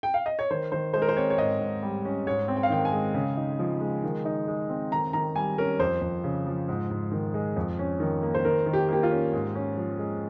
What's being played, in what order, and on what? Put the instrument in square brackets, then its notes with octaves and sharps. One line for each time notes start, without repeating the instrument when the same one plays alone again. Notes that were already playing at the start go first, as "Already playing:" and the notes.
[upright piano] G5
F5
D#5
C#5
[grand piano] D#3 [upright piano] C5
[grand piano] D#3 [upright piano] C5
[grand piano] G#3 [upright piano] C5
[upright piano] A#4
C5
[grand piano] C4 [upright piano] C#5
[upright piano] C#5
[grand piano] G#2 [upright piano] D#5
[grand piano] G#2
G3
C#4
[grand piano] G#2 [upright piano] C#5
[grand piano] C4
[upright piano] G5
F5
[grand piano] D#3 [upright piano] G5
[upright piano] G#5
[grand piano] G#3
C#3
D#4
F3
G#3
D#3
D#4
G#3
C4
[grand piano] D#3 [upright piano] A#5
[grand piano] D#3 [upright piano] A#5
[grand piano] G3 [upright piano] G#5
[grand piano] C#4 [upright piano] A#4
[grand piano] F2 [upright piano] C5
[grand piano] F2
C#3
F3
G#2
G#2
D#3
G#3
F2
C#4
D#3
A#3
[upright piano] C5
[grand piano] D#3 [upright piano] A#4
[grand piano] D#3
[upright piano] G4
[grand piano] A#3 [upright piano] G4
[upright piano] F4
[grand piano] C#4
G#2
C#4
F3
G#3